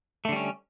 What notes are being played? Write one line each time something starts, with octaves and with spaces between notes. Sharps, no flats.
D3 G3 A3 C#4